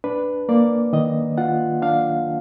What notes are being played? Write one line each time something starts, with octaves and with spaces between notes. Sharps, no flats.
D4 B4
A#3 D5
D#3 D#5
F4 F#5
D4 F5